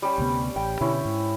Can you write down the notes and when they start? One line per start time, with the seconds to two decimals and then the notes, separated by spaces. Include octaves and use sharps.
0.02 G3 C#4 G4
0.18 D2 C3 B3
0.56 A1 G5
0.81 B2 D3 C#4 E4
1.05 G#2